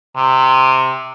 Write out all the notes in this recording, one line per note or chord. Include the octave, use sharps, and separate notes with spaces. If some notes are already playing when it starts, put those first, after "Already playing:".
C3